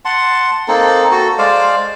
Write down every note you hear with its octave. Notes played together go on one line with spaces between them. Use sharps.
F#5 A5 C6
A#3 C4 D#4 A4
F#4 A4
G#3 C5 D5 F5